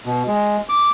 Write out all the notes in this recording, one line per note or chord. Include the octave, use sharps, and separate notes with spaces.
B2
G#3
D6